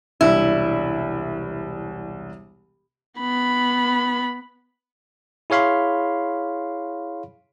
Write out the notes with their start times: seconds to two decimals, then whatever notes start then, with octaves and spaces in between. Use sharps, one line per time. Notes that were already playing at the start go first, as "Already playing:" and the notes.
0.21 E1 C2 D4 E4
3.19 B3 B5
5.50 E4 G#4 C#5 F5 B5 C6